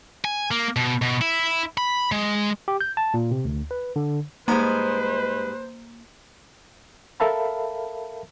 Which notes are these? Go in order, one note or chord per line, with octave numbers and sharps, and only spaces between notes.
G#5
A#3
B2
B2
E4
B5
G#3
G4
G6
A5
A#2
C3
D2
B4
D3
G#2 G3 G#3 A#3 B4 C5 A#5
A4 A#4 E5 F5 A5 B5